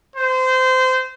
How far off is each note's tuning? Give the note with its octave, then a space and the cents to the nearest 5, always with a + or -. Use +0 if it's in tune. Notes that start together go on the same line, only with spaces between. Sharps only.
C5 -25